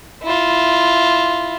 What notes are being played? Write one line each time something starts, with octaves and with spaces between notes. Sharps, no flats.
E4 F4